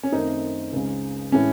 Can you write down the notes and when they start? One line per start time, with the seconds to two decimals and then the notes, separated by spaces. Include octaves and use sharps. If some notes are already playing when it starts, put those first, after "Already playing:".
0.03 C#4
0.12 F#2 D#3 A3 C4 D#4
0.73 C#2 C#3 G#3
1.32 A2 E3 G#3 C#4